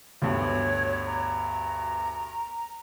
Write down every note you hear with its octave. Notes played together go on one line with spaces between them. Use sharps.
D2 G2 B2 C#5
A#5